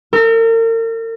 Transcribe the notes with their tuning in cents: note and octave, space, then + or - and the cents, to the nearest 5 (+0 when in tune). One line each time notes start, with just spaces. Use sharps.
A#4 -40 E6 -10